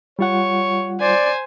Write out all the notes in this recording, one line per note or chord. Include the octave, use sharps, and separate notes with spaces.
G3 F4 C#5 F#5
C5 D5 G#5